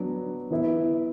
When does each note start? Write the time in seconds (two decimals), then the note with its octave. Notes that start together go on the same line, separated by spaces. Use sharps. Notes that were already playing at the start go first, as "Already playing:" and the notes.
Already playing: F#3 B3 D4
0.51 E3 B3 E4